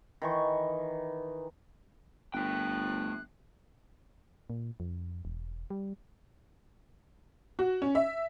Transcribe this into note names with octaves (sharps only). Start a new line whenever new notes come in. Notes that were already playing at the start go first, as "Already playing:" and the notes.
D#3 E3 C#6
G1 A3 G5 F#6
A#2
F2
E1
G3
F#4
C#4
E5